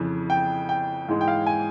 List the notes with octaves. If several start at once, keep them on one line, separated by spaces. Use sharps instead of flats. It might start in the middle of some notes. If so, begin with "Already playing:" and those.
Already playing: F2 C#3 E3
G5
G5
G#2 E3 G#3
G5
F5
G#5